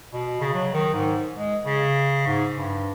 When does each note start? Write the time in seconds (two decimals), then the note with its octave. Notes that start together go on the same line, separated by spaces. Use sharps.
0.13 B2
0.41 C#3
0.54 F#3
0.74 D#3
0.94 G#2
1.36 G#3
1.66 C#3
2.27 G#2
2.56 G2